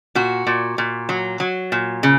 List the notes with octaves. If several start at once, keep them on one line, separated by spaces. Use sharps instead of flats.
A#2 F#4
A#2
A#2
F#3
F#3
A#2
C#3